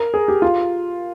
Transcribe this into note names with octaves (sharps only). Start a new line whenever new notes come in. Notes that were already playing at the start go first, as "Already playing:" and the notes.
Already playing: A#4
G#4
G4
F4